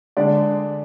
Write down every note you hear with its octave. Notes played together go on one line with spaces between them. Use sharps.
D3 G#3 D5